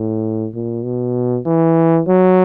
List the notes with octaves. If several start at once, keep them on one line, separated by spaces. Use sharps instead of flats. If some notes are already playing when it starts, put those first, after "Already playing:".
Already playing: A2
A#2
B2
E3
F#3